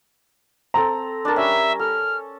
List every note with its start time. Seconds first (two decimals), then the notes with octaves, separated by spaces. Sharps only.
0.74 C4 A4 A#5
1.25 D4 A#4 A5
1.36 G3 C#4 E5
1.79 A4 F6